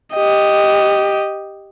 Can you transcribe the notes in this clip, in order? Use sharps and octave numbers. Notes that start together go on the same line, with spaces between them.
G4 D#5